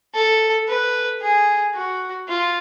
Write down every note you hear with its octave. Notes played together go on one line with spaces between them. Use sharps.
A4
B4
G#4
F#4
F4